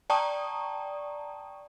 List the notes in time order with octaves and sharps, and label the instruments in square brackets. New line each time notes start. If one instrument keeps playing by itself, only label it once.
[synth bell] D5 G5 A5 A#5 C#6 D#6